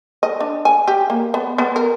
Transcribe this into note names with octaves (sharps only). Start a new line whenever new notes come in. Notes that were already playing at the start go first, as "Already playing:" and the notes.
D#5
D4
G#5
G4
A#3
B3
B3
A#4